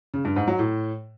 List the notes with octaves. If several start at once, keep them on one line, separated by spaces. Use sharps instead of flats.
C#3
G2
G#2
F#3
A2